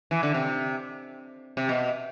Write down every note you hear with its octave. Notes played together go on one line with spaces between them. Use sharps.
E3
D3
C3
C3
B2